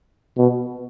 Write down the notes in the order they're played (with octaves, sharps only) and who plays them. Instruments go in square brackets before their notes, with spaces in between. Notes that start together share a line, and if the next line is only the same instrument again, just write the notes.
[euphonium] B2